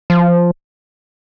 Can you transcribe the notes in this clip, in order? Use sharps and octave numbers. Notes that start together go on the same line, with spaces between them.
F3